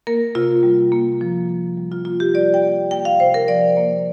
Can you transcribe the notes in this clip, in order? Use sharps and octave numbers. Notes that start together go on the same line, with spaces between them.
A#3 A#4
C3 F4
G3
A#3
F3
A#3
G3
F4
A#3 F4
G4
G3 D5
G5
A#3
A#3 G5
F5
C3 C5
A#4
F3 D5
A#3